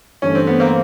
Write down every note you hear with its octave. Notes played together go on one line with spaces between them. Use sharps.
G2 E3 A3 C#4
C4
B3
A#3 C4